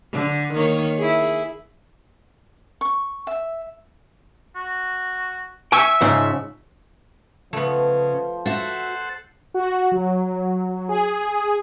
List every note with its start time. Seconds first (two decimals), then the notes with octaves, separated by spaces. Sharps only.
0.13 D3
0.53 D#3 A#3 C#5
0.99 E4 G#4
2.81 C#6
3.27 E5
4.56 F#4
5.72 E5 G5 G#5 C#6 E6
6.01 G#2 C#3 F3
7.53 C#3 F3 A3 B3
8.46 F#4 A4 C5 E5 F#5
9.54 F#4
9.92 F#3
10.89 G#4